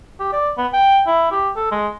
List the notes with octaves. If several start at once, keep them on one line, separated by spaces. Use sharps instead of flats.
G4
D5
B3
G5
E4
G4
A4
G#3